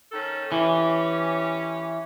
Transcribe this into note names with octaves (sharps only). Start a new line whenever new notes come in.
D#3 C#4 A4
E3 C#4 G4 C#5